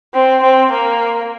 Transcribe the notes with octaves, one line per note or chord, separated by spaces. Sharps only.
C4
C4
A#3